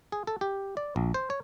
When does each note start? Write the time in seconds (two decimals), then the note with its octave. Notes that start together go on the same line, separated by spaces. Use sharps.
0.12 G#4
0.27 A4
0.41 G4
0.77 D5
0.96 A#1
1.14 C5
1.30 C#5